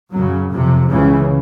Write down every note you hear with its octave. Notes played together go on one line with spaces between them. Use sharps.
F#2 C#3 F#3
F2 C3
C#2 C#3 E3